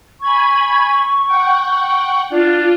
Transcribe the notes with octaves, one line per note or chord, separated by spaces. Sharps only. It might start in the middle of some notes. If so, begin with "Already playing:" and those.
G#5 B5 C#6 G#6
F#5 G5
D4 F4